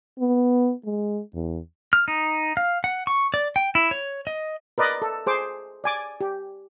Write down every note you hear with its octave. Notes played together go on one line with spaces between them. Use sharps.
B3
G#3
E2
F6
D#4
F5
F#5
C#6
D5
G5
E4
C#5
D#5
A#4 B4 D5 D#5
A4
G#4 C5 D6
D5 G#5 D6
G4